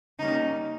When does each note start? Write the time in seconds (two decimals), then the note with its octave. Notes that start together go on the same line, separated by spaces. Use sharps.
0.18 C#3 G3 A#3 C#4 D#4